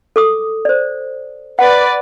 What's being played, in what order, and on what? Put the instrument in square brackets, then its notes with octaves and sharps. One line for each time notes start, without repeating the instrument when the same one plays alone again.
[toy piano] A4 D6 D#6
C5 D5
[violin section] B4 D5 [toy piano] F#5